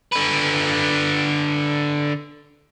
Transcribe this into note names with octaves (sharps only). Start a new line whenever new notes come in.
D3 B4